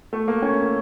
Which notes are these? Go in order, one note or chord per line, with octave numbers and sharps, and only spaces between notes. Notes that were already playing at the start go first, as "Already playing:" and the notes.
A3
A#3
C#4